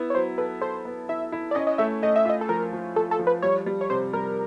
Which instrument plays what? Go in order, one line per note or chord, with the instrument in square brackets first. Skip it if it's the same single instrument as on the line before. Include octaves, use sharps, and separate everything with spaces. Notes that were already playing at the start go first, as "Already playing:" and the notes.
Already playing: [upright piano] B3 E4
[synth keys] C#5
[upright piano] F#3 [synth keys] C5
[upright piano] A4 [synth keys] B4
[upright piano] A4 [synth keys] C5
[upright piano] B3
[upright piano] E4 [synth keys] E5
[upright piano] E4
[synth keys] D5
[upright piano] C#4 [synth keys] D#5
[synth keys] D#5
[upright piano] A3 [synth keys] E5
[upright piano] A3 [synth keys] D#5
[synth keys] E5
[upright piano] F4 [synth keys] D#5
[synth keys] A4
[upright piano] F3 [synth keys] A#4
[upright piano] F3
[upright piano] F3 [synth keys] A4
[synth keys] A4
[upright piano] F3
[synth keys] B4
[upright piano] G3 [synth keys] C#5
[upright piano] G3
[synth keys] C#5
[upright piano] C3 [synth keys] C5
[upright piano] G3 [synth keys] A#4